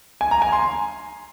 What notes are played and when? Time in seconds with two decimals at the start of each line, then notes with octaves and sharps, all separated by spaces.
0.21 G#5
0.31 A#5
0.42 G#5
0.52 C6